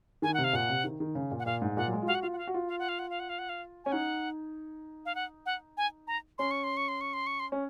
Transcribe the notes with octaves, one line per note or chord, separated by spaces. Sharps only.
D#3 G#5
C3 F#5
F5
A#2 F#5
C3
D#3
D#3
C#3
A#2
F#5
A#2 F5
G#2
A#2 F#5
F#3
G#3
F4
F#4 F5
F#5
F4 F5
F#5
F5
F#4
F4
F5
F#5
F5
F#5
F5
F#5
F5
F#5
F5
C#4 G#5
D#4 F#5
F5
F#5
F#5
G#5
A#5
C#4 C6
C#6
C6
C#6
C6
C#6
C6
C#6
C6
C#4